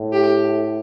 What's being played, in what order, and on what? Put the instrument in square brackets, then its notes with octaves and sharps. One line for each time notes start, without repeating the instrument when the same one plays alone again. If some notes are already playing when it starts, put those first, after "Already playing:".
Already playing: [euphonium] A2
[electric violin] G4